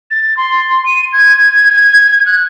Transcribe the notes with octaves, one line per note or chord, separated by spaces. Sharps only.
A6
C6
D#7
G#6
F#6